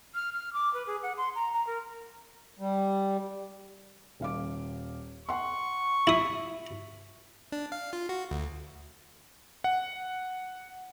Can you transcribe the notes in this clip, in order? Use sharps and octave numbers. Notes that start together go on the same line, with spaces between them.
F6
F6
D6
B4
G#4
F#5
C6
A#5
A#5
A#4
G3
D#1 F5 D6
F#5 C6 C#6
E4 E5 D#6 B6
D4
F5
F4
F#4
D2
F#5